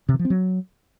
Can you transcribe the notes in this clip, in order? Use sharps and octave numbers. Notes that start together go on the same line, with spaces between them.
C3
D#3
F3
C4
F#3